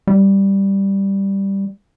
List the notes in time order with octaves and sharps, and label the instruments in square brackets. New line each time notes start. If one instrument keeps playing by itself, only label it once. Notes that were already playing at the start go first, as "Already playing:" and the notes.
[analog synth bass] G3